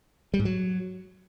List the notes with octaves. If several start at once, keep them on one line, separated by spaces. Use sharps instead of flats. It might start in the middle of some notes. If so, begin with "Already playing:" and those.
G3
G#2
F#3